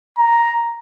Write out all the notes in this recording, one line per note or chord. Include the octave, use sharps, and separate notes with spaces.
A#5